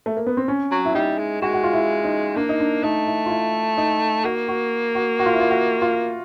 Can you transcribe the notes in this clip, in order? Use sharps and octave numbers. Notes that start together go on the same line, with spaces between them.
A3
A#3
B3
C4
C#4
F#3
E4
G3 D#4
G#3
G#3 F#4
F#4
F4
E4
D#4
A#3 D4
D#4
D4
A3 D#4
E4
F4
E4
D#4
A#3 F#4
F#4
F#4
F#4
F4
E4
F4
F#4
F4